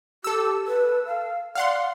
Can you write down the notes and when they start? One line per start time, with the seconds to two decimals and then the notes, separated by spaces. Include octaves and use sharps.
0.24 G4 A4 E6
0.67 B4
1.06 F5
1.55 D5 F5 F#5 C6